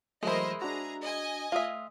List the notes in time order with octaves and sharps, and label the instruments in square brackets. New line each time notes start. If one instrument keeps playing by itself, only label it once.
[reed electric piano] E3 F#3 A3 [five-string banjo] G#3 E4 [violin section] A#4 C5 D#5
[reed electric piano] D4 F#4 [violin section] G#4 A#5
[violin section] D#5 G#5
[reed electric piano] A3 D#6 [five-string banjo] F4 E5